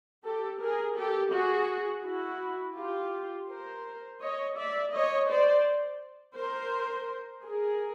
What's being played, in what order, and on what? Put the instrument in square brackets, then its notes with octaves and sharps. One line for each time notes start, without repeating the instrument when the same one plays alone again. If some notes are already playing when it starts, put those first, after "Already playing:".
[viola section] G4 A4
G#4 A#4
G4 A4
F#4 G#4
E4 F#4
F4 G4
A#4 C5
C#5 D#5
D5 E5
C#5 D#5
C5 D5
A#4 C5
G#4 A#4